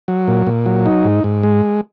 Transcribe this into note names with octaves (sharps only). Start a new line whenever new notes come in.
F#3
A#2
A#2
F#3
D#4
G#2
G#2
G#3